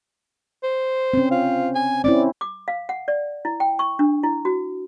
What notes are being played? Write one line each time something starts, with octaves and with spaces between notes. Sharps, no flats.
C5
C4 C#4
F4
G#5
C4 C#4 E4 D5
D6
F5
F#5
D5
E4
G5
C#6
D4
E4
F#4